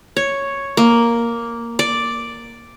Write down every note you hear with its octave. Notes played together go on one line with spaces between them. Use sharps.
C#5
A#3
D5